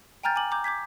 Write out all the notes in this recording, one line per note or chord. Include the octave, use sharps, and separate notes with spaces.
G5 G#5 A#5 F6 G6 A6
G#5 D6 F#7
A#5 D6 G6
D6 G6 G#6 B6